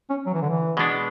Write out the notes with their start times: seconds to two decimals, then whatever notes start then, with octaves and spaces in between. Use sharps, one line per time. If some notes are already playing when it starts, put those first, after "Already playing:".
0.10 C#4
0.26 F#3
0.34 E3
0.42 D3
0.50 E3
0.77 B2 G#3 B3 D4